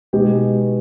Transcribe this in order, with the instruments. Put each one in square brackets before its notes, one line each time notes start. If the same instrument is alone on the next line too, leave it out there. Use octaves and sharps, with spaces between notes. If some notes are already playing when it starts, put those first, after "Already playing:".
[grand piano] B2 G#3 B3 D#4 G4